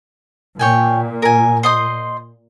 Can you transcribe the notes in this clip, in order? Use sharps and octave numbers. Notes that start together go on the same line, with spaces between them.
A#2 C#5 G5 G#5
A#4 G#5
C5 D#5 C6